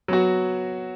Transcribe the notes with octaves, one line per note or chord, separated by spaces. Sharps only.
F#3 B3 F#4